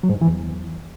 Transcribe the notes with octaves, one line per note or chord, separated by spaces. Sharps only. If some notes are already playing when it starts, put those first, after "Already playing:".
F#3
G#2
G2
E3
E2